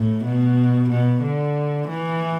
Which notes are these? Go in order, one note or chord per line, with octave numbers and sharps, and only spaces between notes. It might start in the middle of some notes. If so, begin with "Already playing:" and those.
Already playing: A2
B2
B2
D3
E3